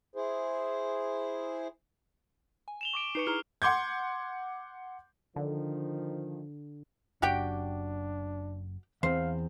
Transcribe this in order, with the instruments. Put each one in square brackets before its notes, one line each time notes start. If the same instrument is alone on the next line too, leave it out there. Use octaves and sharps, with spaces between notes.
[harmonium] E4 G#4 C5
[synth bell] G#5
[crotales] E7 F7 G7
C#6 D6 D7
[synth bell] D#4 B4 C#6 [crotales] C7 C#7
[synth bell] E4 G#4 A#5 [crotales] F6 G7
[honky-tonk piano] F#5 C6 D6 G6 G#6
[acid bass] D3 [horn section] D#3 F3
[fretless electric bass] F#1 F#2 F#3 [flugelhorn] D4 [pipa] F#4 G4 G5
[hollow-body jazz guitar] E2 C4 [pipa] C5 [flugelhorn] F5